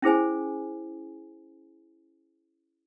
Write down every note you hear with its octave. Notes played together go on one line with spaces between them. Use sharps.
C#4 E4 G#4 C5 G#5